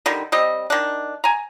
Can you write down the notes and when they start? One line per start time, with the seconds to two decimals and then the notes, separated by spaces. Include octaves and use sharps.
0.06 D3 D#3 G3
0.32 G3 C4 D#5
0.70 D#3 D4
1.24 G#5 A#5